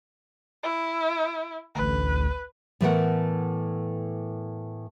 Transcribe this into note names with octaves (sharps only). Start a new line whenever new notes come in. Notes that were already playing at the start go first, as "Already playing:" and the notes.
E4
A1 D2 B4
A2 E3 A3 B3 A#4 F#5